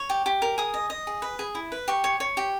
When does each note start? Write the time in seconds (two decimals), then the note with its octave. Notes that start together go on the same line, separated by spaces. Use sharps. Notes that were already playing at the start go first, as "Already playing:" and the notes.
Already playing: C#5
0.10 G4
0.26 G4
0.42 A#4
0.58 G#4 D#6
0.74 D#5
0.90 D#5
1.07 G#4
1.22 B4
1.39 G#4
1.55 E4
1.72 B4
1.88 G4 C#6
2.04 C#5
2.20 C#5
2.37 G4